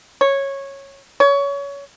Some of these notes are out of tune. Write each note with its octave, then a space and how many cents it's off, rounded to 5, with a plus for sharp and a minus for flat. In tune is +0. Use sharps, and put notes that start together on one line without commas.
C#5 -10
C#5 +25